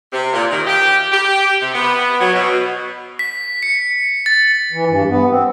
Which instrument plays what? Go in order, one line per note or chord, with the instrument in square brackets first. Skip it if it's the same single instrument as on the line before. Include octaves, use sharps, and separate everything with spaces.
[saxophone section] C3
A#2
D#3
G4
G4
C3
B3
F#3
B2
[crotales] B6
C#7
A6
[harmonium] E3
G2
B3
C4